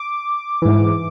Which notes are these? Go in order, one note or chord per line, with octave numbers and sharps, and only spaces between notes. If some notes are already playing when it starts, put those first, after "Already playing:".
Already playing: D6
G#2 E3